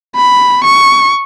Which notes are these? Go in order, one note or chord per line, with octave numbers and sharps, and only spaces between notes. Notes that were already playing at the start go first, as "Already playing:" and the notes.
B5
C#6